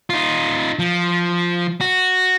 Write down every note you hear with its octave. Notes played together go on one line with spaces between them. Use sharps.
D#4 F4
F3
F#4